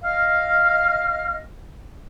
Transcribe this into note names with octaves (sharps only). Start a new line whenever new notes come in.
D#5 F5 F6